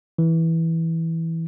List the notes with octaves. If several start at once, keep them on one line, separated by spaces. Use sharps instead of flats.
E3